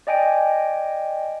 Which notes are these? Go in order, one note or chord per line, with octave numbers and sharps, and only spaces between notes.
D5 D#5 G5 G#5 D7